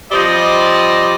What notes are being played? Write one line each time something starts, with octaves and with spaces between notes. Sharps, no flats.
F3 G3 C4 D5 D#5